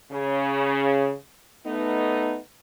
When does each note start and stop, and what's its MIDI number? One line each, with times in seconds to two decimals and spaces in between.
0.12 1.11 49
1.66 2.36 57
1.66 2.36 59
1.66 2.36 63